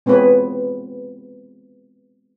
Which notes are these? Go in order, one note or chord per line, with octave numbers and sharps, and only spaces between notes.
G#3 B3 C4 F4 B4 C#5